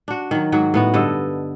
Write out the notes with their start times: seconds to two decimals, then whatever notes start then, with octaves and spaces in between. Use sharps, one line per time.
0.08 D4 F#4
0.31 D#3 F#3
0.52 G#2 F#3 F#4
0.74 A2 B3 F#4
0.94 G2 D3 A4 D#5